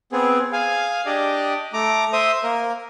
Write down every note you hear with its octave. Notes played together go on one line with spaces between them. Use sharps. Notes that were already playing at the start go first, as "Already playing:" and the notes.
B3 C4 G#4
G#4 F5 G#5
D4 G4 D5 D#5
A3 A#5 D6
C5 E5 D#6
A#3 A#4